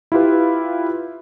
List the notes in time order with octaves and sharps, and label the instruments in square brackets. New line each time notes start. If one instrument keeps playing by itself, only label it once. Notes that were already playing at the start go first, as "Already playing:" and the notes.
[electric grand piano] E4 F4 G4 B4